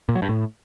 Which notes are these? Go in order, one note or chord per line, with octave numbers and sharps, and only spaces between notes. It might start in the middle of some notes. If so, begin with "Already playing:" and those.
A#2
F#3
G2
A2